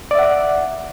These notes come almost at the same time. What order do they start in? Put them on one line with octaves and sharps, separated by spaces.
D5 E5 F#5